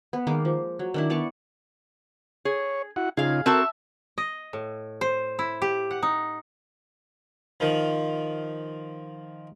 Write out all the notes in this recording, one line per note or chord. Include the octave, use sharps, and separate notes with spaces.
B3
D#3 G#3 A#3 D6
F3
F#3
D#3 D4 E4
B3 D5 A5 C#6
G#4 C#5
E4 F#4 F#5
C#3 D#4 F4 G#4 F5
C4 F#4 A4 A#4 E5 A5
D#5
A2
C5
E4
G4
F#5
D#4
D#3 F3